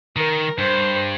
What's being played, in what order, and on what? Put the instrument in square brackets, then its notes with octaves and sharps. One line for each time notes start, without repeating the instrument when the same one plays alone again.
[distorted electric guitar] D#3 [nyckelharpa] A#4
[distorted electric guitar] G2 [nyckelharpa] C5